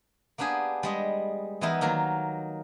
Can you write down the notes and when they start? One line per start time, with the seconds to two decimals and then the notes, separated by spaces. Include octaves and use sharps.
0.38 A#3 B3 D4 G4 G#4
0.83 G3 G#3 D#5
1.61 E3 G3 B3 D#4 E4 A#4
1.81 D#3 F#3 A#3 A#4